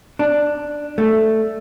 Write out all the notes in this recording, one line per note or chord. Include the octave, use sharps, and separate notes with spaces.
D4
A3